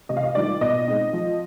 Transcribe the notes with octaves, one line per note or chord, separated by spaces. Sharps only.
C3 D#5
F5
D#5
D#3 G3 D4 F4 D5
B2 D#5
G#3 C4 D#4
F3